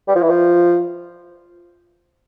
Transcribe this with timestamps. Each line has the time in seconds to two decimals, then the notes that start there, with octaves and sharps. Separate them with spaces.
0.08 G3
0.15 F3
0.22 E3
0.29 F3